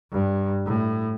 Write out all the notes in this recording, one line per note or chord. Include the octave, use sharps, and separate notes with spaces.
G2
A2